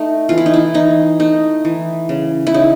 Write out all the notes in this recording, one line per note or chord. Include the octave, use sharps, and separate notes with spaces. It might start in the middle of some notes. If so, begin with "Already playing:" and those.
Already playing: A3 D#4
E3 F4
E4
D#4
E4
E3 D#4
A3 D#4
E3
C#3
E4
C#3 D#4